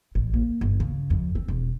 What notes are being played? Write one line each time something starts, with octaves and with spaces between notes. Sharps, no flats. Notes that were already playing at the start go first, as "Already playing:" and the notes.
A1
A#3
G1
C#3
F2
C4
E1